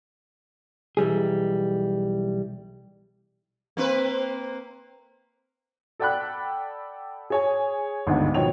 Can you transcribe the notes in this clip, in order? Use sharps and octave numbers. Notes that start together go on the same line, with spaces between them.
B1 E3 G3 G#4
A#3 C4 B4
A4 D5 F#5 G5 B5 F#6
G#4 C#5 G#5
G1 D2 G#2 D3 D#3
B2 D#3 F3 C#5 G5 F7